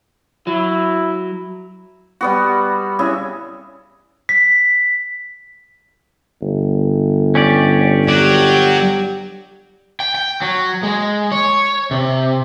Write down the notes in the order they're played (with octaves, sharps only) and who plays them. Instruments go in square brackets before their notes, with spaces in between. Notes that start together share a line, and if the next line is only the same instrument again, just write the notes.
[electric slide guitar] F#3 [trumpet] E4
[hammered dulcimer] G3 B3 F#4
C#3 E4 G#4
[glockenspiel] B6
[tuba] G1
[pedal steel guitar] C#4 G4 D5
[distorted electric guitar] F#3 [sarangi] G4 [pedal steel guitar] D5
[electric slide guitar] G5
G5
F#3
G#3
C#5
C3